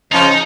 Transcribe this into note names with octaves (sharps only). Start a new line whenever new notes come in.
C#3 F3 D#4